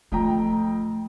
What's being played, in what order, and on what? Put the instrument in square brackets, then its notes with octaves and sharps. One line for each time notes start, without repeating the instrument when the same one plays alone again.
[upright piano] F2 G5 A#5 [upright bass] D3 A3